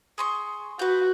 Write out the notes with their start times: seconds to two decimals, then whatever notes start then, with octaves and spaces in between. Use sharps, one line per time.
0.18 G#4 C6 C#6
0.79 F#4 B4 G6